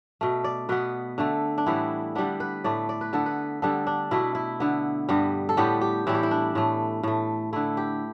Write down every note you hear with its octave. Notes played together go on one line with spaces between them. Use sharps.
B2 A3
D5
B2 B3 B4
D3 A3
D4
A2 E3 G3 B3 E4
D3 G3 B3 D4
B4
A2 A3 D5
D5
B4
D3 B3 A4
B4
D3 G3 B3 A4
D4
B2 A3 E4
E4
D3 B3
G2 G3 B3
A4
A2 G3 B3 G4
G4
A2 E3 G3 E4
G4
E4
D4
A2 A3
A2 A3
D3 A3 E4
G4